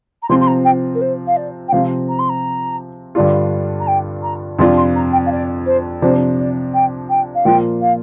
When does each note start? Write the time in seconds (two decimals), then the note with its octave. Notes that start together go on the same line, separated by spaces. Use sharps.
0.22 A#5
0.29 C3 F3 C4 F4 C6
0.41 C6
0.47 A#5
0.64 G5
0.94 A#4
1.01 C5
1.27 F5
1.36 D5
1.68 G5
1.72 C3 F3 C4 F5
2.08 A#5
2.19 C6
2.29 A#5
3.15 G2 D3 G3 D4 F4
3.79 A#5
3.87 G5
4.22 A#5
4.59 F2 C3 F3 D4 F4 C6
4.77 C6
4.95 A#5
5.12 G5
5.26 F5
5.31 D5
5.66 C5
6.01 C3 F3 D4 C5
6.38 D5
6.74 G5
7.09 G5
7.35 F5
7.45 A#2 F3 A#3 F4 G5
7.81 F5